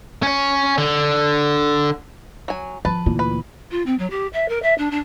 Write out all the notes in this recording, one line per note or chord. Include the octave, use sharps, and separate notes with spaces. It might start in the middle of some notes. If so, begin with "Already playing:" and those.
C#4 C#5
D3
F#3 G#5
F3 B4 A5
D2 A#2 E3 F4
B4
F4
C4
F#3
G4
E5
A#4
E5
D4
D4